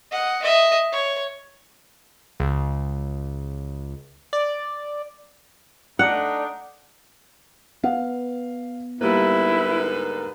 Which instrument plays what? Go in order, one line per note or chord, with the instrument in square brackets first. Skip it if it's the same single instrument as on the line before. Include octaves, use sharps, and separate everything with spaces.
[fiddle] D#5 F#5
D#5 E5
C#5
[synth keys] C#2
D5
[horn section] A3 D4 D#4 [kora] F#5
[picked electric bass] B3 [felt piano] F5
[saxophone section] G#2 D3 B4 [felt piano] G3 A#3 [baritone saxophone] E4